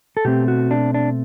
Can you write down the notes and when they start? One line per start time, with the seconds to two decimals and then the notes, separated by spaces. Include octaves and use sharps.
0.17 A4
0.25 B2 A3 C4 G4
0.48 F#4
0.71 D4
0.94 D4